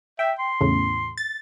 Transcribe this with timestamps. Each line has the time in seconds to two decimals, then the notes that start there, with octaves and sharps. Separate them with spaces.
0.19 E5 G5
0.39 C6
0.61 E2 A2 C#3
1.18 A6